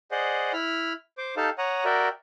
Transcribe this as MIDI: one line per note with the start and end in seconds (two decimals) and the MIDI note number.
0.11 0.53 68
0.11 0.53 72
0.11 0.53 74
0.11 0.53 75
0.11 0.53 78
0.53 0.93 64
0.53 0.93 83
0.53 0.93 89
1.18 1.35 72
1.18 1.35 86
1.37 1.50 63
1.37 1.50 67
1.37 1.50 69
1.37 1.50 77
1.37 1.50 81
1.58 1.84 73
1.58 1.84 78
1.58 1.84 82
1.58 1.84 87
1.85 2.09 66
1.85 2.09 70
1.85 2.09 74
1.85 2.09 76
1.85 2.09 79